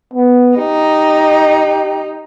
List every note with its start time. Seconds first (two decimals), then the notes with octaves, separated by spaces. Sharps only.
0.14 B3
0.57 D#4 G4